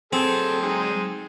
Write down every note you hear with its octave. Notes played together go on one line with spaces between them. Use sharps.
F#3 C4 G#4 A4 G5
G#3 D#4